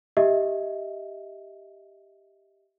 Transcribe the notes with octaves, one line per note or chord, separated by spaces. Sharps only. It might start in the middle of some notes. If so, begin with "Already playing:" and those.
G4 D#5 E5